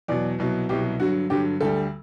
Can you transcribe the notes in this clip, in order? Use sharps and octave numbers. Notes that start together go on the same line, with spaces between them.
E2 B2 F#3 D5
C2 B2 F#3
C2 B2 F#3 G4
G2 D3 F#3 F#4
G2 D3 F#3 G4
D2 D3 G3 A4